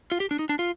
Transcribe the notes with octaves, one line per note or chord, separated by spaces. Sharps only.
F4
G4
D4
D#4
D4
F4